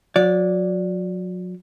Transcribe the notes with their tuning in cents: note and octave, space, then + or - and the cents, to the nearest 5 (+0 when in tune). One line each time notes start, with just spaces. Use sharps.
F#3 -30 D5 -10